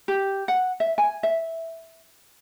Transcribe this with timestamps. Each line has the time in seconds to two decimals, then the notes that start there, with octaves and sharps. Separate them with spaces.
0.08 G4
0.48 F#5
0.80 E5
0.98 G#5
1.23 E5